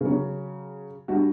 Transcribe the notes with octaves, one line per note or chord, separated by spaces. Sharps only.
C#3 F#3 C#4
G3 D4 F#4